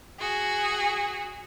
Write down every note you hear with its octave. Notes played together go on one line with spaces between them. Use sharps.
F#4 G#4